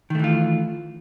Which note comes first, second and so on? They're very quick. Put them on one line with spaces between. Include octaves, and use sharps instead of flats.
D#3 A3 E3 F4